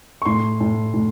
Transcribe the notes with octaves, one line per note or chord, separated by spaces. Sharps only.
C#6
A2 C6
A2
A2